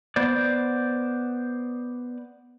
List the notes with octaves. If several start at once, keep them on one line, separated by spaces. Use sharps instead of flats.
B3 C5 D5